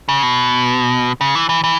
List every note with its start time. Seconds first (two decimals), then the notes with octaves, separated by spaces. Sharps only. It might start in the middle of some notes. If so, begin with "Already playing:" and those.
0.09 C#3
0.23 B2
1.21 C#3
1.35 E3
1.49 E3
1.64 E3